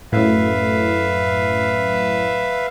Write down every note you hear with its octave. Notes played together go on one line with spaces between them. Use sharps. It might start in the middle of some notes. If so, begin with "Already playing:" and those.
F#2 A2 B4 E5 F5